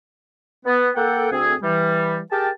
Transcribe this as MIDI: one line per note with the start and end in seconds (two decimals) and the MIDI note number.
0.66 0.90 59
0.96 1.27 58
0.96 1.27 69
0.96 1.27 78
0.96 1.27 79
1.31 1.54 38
1.31 1.54 60
1.31 1.54 68
1.31 1.54 80
1.63 2.19 52
1.63 2.19 55
2.32 2.50 67
2.32 2.50 68
2.32 2.50 70
2.32 2.50 79
2.32 2.50 81